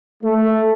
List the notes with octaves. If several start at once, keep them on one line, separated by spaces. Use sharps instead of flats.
A3